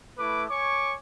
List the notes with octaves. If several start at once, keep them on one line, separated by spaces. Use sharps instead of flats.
A3 E4 B4 D6
C#5 G#5 C#6 D6